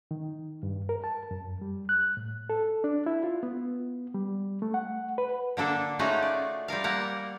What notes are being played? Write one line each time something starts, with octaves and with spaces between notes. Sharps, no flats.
D#3
G2
A#4
A5
F#2
G3
F#6
A2
A4
D4
E4
F4
B3
G3
A3
F#5
B4
D3 A#3 D4 A4
A3 C#4 D#4 F4 F#4 G#4
D5
G3 F4 A#4 F5
G3 A#3 A#4 F#5